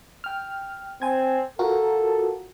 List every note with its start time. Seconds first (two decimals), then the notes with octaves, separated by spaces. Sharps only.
0.24 G5 F6
1.02 C4 G#5 G#6
1.59 F4 F#4 A4 A#4